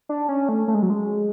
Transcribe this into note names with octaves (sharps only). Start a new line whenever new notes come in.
D4
C#4
A3
A3
G#3
F#3
G#3